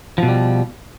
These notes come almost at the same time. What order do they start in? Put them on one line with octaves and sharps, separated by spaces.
F3 B2 G3